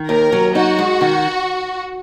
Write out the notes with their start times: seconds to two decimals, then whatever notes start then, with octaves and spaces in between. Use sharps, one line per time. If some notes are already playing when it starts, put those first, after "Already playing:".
Already playing: D#3
0.08 D#2 A#4
0.32 F#3
0.55 D#4 F#4
0.78 G#3
1.01 D#3